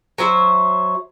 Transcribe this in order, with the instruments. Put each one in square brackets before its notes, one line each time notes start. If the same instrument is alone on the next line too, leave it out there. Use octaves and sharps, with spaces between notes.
[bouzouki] F#3 C5 E5